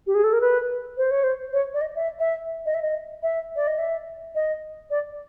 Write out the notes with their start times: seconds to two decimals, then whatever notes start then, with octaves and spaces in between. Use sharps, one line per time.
0.07 G4
0.15 G#4
0.24 A4
0.33 A#4
0.41 B4
0.98 C5
1.11 C#5
1.24 C5
1.53 C#5
1.74 D5
1.81 D#5
1.95 E5
2.20 E5
2.66 D#5
2.74 E5
2.82 D#5
3.23 E5
3.56 D5
3.68 D#5
3.79 E5
4.35 D#5
4.90 D5